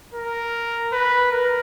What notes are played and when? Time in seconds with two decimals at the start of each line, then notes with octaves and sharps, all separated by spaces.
0.14 A#4
0.93 B4
1.31 A#4